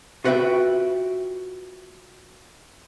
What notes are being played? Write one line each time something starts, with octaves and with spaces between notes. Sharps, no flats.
F4 F#4 B4 D#5 E5 G5